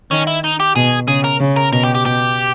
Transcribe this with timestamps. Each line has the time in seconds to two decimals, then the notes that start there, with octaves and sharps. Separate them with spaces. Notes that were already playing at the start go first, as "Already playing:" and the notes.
0.11 D#3 C#4
0.27 E4
0.44 D#4
0.60 G4
0.76 B2 G#4
1.07 C#3 G#4
1.24 A#4
1.40 C#3
1.57 A#4
1.72 B2 A#4
1.84 G4
1.94 G4
2.05 B2 G4